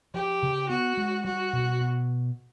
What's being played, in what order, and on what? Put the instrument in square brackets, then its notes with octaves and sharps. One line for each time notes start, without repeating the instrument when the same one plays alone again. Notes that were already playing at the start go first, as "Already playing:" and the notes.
[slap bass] F3 [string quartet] G4
[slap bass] C#3
[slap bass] B3 [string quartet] F#4
[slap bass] G#3
[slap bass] G3 [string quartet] F#4
[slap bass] B2
B2